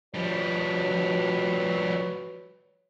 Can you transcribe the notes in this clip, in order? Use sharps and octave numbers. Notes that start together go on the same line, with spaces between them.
F3 G3 F#4 B4 C#5